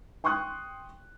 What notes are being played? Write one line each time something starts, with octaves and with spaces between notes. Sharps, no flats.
G5 C6 C#6 D#6 F#6